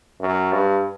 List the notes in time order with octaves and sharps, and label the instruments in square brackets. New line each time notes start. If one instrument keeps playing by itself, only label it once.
[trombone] F#2
G2